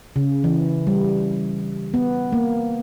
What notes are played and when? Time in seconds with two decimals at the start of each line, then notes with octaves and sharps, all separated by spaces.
0.16 C#3
0.44 E3
0.87 G3
1.94 B3
2.32 A#3